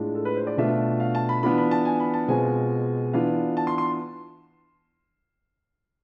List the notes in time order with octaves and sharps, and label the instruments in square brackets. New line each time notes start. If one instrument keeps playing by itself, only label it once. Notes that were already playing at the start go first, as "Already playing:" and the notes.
Already playing: [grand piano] A2 G#3 D4 F4
A4
B4
C5
D5
B2 A3 D4 F4 E5
F5
A5
B5
E3 B3 D4 F4 B5
B5
A5
G#5
B5
A5
B2 G#3 C4 F4 G#5
E3 B3 D4 F4 F5
A5
C6
C6